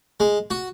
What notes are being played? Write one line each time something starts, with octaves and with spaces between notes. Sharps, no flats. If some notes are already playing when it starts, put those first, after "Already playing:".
G#3
F#4